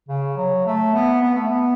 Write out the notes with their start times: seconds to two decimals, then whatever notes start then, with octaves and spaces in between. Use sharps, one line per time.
0.09 C#3
0.37 F#3
0.66 A3
0.94 B3
1.21 B3
1.34 A3
1.47 B3